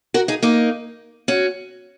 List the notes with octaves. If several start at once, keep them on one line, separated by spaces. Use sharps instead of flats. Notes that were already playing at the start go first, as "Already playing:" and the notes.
F#4 A#4
D#4 G#4
A#3 D#4
C#4 F#4